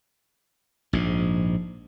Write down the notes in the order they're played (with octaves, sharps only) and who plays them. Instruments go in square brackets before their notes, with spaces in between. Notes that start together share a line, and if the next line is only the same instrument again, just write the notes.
[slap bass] A#1 G#2